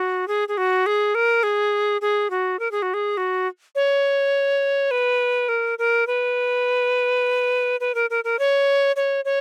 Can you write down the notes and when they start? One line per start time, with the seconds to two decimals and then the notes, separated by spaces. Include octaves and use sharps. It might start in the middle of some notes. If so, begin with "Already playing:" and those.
Already playing: F#4
0.28 G#4
0.48 G#4
0.57 F#4
0.86 G#4
1.15 A#4
1.43 G#4
2.01 G#4
2.30 F#4
2.59 A#4
2.71 G#4
2.82 F#4
2.94 G#4
3.17 F#4
3.75 C#5
4.91 B4
5.49 A#4
5.79 A#4
6.07 B4
7.80 B4
7.95 A#4
8.10 A#4
8.24 A#4
8.39 C#5
8.96 C#5
9.25 C#5